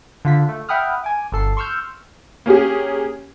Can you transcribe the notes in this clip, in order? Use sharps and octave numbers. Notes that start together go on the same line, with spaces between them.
D3 F4 B6
A3
E5 F#5 G5 B5 D#6 F6
G#5 D6
G1 A4 C7
C6 C#6 E6 F6 G6
A#3 C#4 G4 G#4